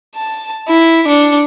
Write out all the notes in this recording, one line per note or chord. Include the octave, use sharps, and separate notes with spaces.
A5
E4
D4 C#7